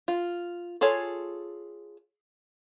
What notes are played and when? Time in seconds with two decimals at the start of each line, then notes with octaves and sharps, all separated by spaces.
0.08 F4
0.81 F4 G#4 A4 C#5